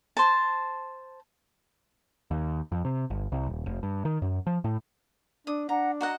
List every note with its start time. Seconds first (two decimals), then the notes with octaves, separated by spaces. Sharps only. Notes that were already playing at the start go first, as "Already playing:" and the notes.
0.17 C5 A5
2.31 D#2
2.72 F2
2.85 C3
3.10 G1
3.32 C2
3.47 D#1
3.66 F1
3.83 G2
4.05 D#3
4.22 F#2
4.47 F3
4.64 A2
5.47 D4 D#6
5.69 D4 F#5 A#5
6.01 F#4 D#5 F#5 A#5